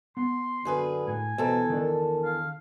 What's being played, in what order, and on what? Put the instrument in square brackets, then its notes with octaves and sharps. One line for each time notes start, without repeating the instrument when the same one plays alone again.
[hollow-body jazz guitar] B3 [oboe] C6
[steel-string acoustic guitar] F#2 G#4 B4 [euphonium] D3
[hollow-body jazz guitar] A2 [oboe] G#5
[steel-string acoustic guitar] E2 A4 [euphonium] B2 [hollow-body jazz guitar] C5 A#5
[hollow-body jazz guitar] D#3 D4 [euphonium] A#4
[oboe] F5